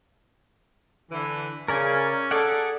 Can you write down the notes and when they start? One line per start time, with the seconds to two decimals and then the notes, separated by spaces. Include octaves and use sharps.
1.11 D3 E3
1.68 C#3 C#4 A#4 D5 G#5
2.31 G#4 A4 D5 F#5